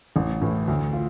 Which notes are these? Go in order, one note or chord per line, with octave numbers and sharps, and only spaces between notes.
A1
A2 E3
D2
F4